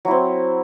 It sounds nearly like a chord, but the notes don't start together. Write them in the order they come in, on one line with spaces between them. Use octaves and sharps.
F#3 E4 C4